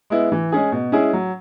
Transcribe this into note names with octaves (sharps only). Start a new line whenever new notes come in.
G#3 B3 E4
E3
G#3 C#4 G#4
B2
G#3 C#4 E4 G#4
F#3